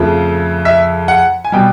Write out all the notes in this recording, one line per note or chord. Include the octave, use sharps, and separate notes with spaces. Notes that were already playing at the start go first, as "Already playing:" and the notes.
Already playing: F2 C#3 F3 A3
E5
F#5
G#5
B2 G3 G5